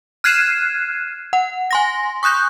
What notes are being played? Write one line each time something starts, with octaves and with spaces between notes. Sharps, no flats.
F6 F#6 G#6 C7 D#7 E7
F#5
G#5 C6 A#6
C#6 D#6 F#6 G6